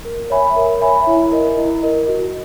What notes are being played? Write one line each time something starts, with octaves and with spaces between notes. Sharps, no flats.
A#4
C#5 E5 G#5 B5
A#4
C#5 E5 G#5 B5
E4
A#4 D#5
E4
A#4 D#5
F#4